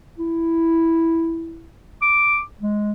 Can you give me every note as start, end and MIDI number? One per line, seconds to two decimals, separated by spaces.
0.18 1.68 64
2.02 2.41 86
2.61 2.93 56